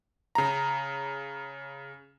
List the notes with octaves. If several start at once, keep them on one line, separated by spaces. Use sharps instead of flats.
C#3 A#5